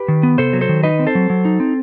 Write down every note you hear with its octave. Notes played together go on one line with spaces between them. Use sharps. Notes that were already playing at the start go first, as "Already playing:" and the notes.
Already playing: G4 B4
D#3
B3
C3 A4 C5
F#3
A4 C5
D#3
D#4 B4 D#5
C4
A4 C5
F#3
F#3
D#4
C4